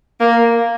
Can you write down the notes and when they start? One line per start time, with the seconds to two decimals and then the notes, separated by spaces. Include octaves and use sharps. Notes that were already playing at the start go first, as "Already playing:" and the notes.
0.20 A#3